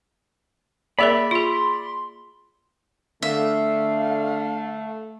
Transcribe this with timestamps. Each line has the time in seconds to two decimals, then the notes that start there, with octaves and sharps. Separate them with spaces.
0.99 A#3 G#4 A#4 D5 E5 B5 D6
1.31 F4 G#4 C6
3.22 D3 A3 E5 F5